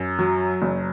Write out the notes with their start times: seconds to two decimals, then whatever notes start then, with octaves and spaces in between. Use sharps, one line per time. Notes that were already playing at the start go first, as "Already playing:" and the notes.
Already playing: F#2
0.19 F#3
0.62 F#1